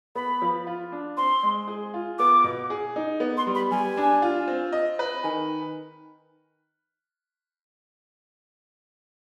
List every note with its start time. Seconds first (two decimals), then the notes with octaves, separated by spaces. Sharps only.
0.15 B3 B5
0.42 F3
0.67 F4
0.92 D4
1.17 C4 C6
1.43 G#3
1.68 G#4
1.94 F4
2.19 B3 D6
2.44 B2
2.70 G#4
2.96 D#4
3.20 B3
3.37 C6
3.47 G3
3.55 B5
3.71 G3 G#5
3.97 D4
4.22 F4
4.48 C4
4.73 D#5
4.99 B4
5.24 D#3 G#5